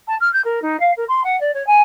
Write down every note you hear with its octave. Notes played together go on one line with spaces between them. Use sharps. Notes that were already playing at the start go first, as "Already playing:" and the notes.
A5
F6
G6
A#4
D#4
F5
A#4
C6
F#5
D5
C#5
G#5